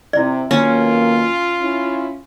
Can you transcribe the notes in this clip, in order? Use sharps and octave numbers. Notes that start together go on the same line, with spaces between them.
C3 E4 D5
B1 D#3 A#3 C#4 F4
C#4 E4